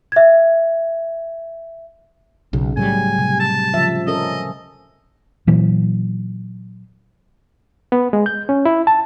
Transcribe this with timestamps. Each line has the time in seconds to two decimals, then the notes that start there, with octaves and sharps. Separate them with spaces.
0.12 E5 G#6
2.53 B1 C#3
2.77 A2 F#3 G3 G#5
3.19 C3
3.39 A5
3.74 C#3 F3 E5
4.07 C#4 A4 A#4 D#5
5.47 A#2 E3 F#3
7.92 B3
8.13 G#3
8.26 G6
8.49 C#4
8.65 E4
8.87 A5